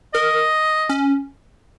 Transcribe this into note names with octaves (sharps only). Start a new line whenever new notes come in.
A#4 D#5
C#4